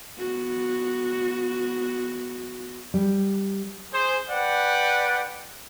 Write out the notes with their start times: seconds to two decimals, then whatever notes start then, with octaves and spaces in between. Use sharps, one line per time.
0.19 B3 F#4
2.94 G3
3.92 G#4 C5
4.30 B4 D5 F#5 G5